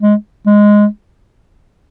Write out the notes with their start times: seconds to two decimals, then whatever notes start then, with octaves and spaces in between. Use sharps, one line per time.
0.02 G#3
0.46 G#3